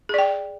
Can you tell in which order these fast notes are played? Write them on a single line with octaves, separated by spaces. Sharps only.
G#4 D5 G5